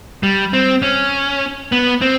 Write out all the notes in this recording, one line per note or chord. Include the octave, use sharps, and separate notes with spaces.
G3
C4
C#4
B3
C4